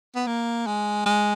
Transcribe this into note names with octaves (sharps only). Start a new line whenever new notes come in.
B3
A#3
G#3
G#3